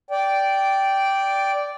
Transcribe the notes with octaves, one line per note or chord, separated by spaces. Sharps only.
D5 G5